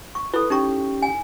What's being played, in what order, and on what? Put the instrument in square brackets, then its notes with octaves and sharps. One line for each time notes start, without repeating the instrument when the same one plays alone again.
[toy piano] C#6
[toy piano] E4 A4 [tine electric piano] B4
[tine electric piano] C#4 G4 G5 [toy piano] D#4 C#6
[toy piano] G#5